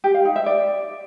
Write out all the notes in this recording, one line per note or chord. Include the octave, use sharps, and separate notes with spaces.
G4
F5
D#4
E5
D5